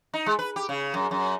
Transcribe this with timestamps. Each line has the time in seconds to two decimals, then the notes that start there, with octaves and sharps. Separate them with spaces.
0.14 D#4
0.26 G#3
0.39 B4
0.56 G4
0.69 C#3
0.94 F#2
1.11 F#2